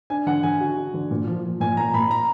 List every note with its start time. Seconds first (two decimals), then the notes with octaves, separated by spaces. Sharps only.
0.10 D4 G#5
0.26 D3 F#5
0.43 D3 G#5
0.60 F#4
0.77 F#4
0.94 D3
1.11 A#2
1.27 F3
1.44 F3
1.60 A#2 G#5
1.77 A#2 A#5
1.94 A#2 B5
2.11 A#5